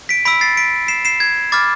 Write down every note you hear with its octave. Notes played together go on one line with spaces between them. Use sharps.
B6 D7
B5 E6 B6 D7
A6 C7
B6 D7
C7 E7
C7 E7
G#6
B5 D6 F6 A6